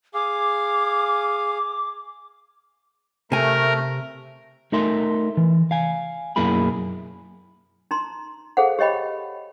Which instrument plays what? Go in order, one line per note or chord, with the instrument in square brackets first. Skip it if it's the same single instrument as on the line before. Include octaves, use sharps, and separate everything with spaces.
[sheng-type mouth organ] G#4 F5 [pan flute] D6
[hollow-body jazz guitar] C3 G#5 [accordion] A3 [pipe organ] A#4
[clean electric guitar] A3 D#4 A#4 E5 C6
E3
F5 G#5
B1 F#2 A#3 E4 G#4 B5
[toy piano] D#4 A#5 C6
G#4 A4 C5 F5 F#5
G4 C#5 D#5 G5 B5